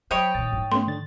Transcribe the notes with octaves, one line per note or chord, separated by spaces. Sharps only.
F#3 C5 C#5 D#5 G5 B5
A#2 D#3 A6
G#2 F3
A3 B3 C#4 C6
D3 D4 A6